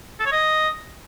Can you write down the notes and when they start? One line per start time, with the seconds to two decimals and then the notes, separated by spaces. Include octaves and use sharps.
0.20 A4
0.26 C#5
0.32 D#5